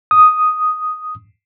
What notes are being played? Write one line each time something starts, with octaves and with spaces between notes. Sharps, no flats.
D#6